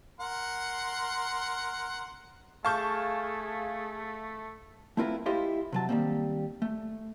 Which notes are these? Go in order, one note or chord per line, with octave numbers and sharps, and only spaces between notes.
A#4 F#5 C6
A3 G#4 F5 A5 C#6 G6
A3 C4 E4 F4 A#4 B4
E4 F4 G4 C5 D#5 F5
C3 F#3 A5
D#3 G3 A#3 C4
A3